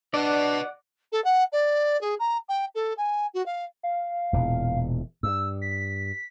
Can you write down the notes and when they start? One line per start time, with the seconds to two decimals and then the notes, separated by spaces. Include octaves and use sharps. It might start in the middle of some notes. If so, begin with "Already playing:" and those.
0.14 D4 B4 D5 D#5 F#5
1.12 A4
1.24 F#5
1.52 D5
2.01 G#4
2.19 A#5
2.48 G5
2.74 A4
2.97 G#5
3.33 F#4
3.45 F5
3.83 F5
4.33 E1 A#2 E3
5.23 G2 E6
5.62 B6